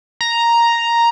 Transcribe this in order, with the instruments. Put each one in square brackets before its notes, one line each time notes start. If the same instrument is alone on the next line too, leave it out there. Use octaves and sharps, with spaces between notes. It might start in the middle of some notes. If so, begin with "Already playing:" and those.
[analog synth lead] A#5